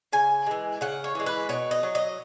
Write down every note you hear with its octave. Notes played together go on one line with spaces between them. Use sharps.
C#3 G#5
E3 G#3
C#3 F#5
C#5
E3 G#3
B4
B2 C#5
D#5
F#3
D#5